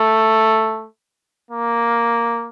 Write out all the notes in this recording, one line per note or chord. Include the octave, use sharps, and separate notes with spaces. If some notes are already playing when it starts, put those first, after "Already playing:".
Already playing: A3
A#3